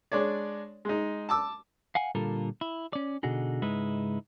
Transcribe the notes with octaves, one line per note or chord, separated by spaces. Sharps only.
G#3 D4 C#5 D5
G#3 D#4
A5 D6 E6
F5 F#5 G#5
A#2 D3 G3 F4 A4 A#4
E4
C#4 D5
B2 D3 D#4 F#4 G#4
C#2 G#2 G#3 D#4 E4 B4